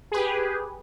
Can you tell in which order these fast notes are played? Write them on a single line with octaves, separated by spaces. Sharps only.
G#4 B4 G4